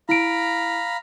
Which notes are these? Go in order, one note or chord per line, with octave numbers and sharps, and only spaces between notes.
E4 F5 A#5 B5 D7